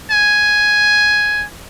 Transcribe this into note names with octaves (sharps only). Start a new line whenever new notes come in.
G#5